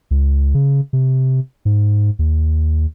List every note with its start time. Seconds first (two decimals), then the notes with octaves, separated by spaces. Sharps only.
0.11 C#2
0.54 C#3
0.93 C3
1.65 G#2
2.19 D#2